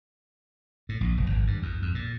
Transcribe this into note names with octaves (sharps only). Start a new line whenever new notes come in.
A2
A#1
F1
G#1
G2
E2
F2
A#2